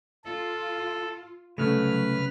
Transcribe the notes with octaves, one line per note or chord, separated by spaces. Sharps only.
F4 A4
C2 C#3 F#3 A3 B4 F6